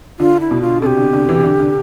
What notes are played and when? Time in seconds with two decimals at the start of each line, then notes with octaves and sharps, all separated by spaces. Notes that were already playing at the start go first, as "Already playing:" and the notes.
0.19 D3 F4
0.40 E4
0.51 B2
0.61 F4
0.81 C3 G4 A4
0.98 D3
1.13 D3
1.29 E3
1.44 D3
1.60 D3